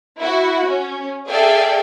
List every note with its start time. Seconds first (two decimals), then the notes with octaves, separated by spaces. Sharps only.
0.20 E4 F#4
0.67 C#4
1.29 G#4 A4 D5 E5 F5 G5